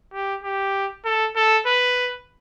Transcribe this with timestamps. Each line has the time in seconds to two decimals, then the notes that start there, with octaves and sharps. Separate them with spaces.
0.14 G4
0.44 G4
1.05 A4
1.36 A4
1.67 B4